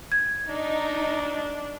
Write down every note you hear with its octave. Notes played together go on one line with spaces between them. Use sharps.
G#6
D4 D#4